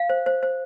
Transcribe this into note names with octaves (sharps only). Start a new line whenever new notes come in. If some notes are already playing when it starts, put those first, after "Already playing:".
Already playing: F5
C5
C5
C5